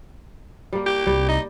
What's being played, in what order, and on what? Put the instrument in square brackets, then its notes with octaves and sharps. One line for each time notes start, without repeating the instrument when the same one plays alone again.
[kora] G3 A#3
[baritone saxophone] G4
[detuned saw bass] C2 [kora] G3
[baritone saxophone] D#4